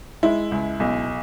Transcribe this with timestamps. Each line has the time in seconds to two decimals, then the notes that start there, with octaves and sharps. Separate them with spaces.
0.23 G#3 E4
0.52 C#2
0.80 B1